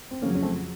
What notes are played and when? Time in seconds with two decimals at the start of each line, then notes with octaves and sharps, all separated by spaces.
0.11 C4
0.22 F2 C#3 F#3 A#3 C#4
0.35 C#4
0.42 A3 C4